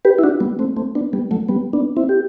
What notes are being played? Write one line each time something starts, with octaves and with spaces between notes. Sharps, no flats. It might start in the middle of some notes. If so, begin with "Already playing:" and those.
G4 B4
E4
D4 F#4
G3 B3
A3 C4
A3 C4
B3 D4
G3 B3
F#3 A3
G3 B3
B3 D4
C4 E4
G4